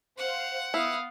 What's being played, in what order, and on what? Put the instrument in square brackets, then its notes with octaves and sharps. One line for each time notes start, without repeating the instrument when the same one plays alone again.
[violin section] C5 F5 [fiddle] F#5
[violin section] B3 [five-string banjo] E4 [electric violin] F5 D#6